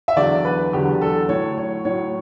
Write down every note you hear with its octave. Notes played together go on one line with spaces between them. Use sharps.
E5
E2 D3 F#3 D5
B4
E2 D3 F#3 G4
A4
A2 F#3 C#5
C#5
A2 F#3 C#5